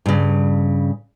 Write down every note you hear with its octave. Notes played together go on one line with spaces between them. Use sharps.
G2 C#3